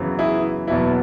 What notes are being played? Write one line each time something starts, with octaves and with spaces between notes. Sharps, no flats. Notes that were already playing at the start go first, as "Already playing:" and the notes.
Already playing: F#2 C#3 E3 B3
E4 G#4
F#1 E2 B2 F#3 B3 E4